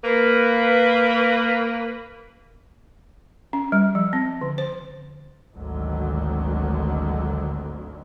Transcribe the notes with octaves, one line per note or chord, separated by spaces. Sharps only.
A#3 B4
C#4
G3
F3
C4
D3
C5
G#1 D2 D3 D#3 F#3